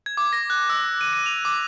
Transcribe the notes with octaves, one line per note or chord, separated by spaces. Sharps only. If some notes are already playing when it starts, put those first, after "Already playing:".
G#6
D6
A#6
F#6
E6
D#7
D#7
F7
D6